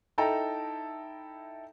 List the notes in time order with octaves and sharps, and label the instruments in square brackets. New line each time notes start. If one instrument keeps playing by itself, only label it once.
[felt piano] D#4 E4 A4 G5 A5 A#5